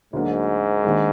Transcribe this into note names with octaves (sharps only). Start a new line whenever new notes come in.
D2 G#2 D3 F#3 A#3 D4
D#2 D#3 G#3 D4